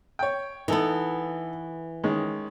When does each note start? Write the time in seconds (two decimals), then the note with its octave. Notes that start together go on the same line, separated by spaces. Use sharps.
0.19 C#5 G5
0.68 E3 B3 D#4 A4
2.04 D#3 G#3 C#4